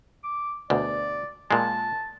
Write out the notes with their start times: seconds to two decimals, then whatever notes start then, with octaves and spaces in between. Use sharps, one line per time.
0.24 D6
0.70 D2 B2 D5
1.51 A#2 G#3 A5